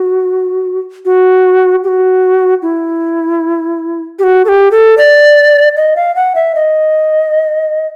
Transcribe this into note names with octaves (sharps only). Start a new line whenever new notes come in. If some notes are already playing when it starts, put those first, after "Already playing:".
Already playing: F#4
F#4
G4
F#4
E4
G4
F#4
A4
G4
A4
D5
D#5
F5
F#5
E5
D#5